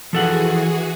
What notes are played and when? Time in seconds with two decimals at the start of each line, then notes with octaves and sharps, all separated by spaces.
0.13 E3 F3 F#4 G#4 A4 F#5